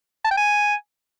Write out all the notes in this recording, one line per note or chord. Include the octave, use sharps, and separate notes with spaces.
A5
G5
G#5